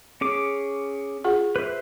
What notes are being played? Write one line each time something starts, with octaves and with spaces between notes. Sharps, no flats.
C#4 G#4 D6
F4 G#4 F#5
B4 C5 E5